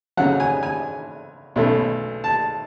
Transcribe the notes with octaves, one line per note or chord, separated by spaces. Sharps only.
F2 C#3 F#3 F#5
G#5
G#5
B1 B2 A3 C#4
A5